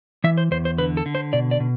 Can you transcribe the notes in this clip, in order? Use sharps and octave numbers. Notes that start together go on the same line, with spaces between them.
E3 E5
C5
E2 C5
C5
D3 B4
A4
D3
C5
B2 D5
D5
B2